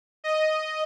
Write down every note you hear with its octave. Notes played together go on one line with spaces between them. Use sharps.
D#5